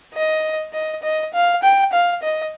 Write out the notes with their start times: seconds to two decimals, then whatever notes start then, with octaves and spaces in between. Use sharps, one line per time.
0.14 D#5
0.73 D#5
1.03 D#5
1.34 F5
1.63 G5
1.93 F5
2.23 D#5